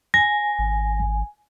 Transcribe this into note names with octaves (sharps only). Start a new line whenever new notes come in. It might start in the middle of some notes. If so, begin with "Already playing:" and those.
G#5 A#6
G#1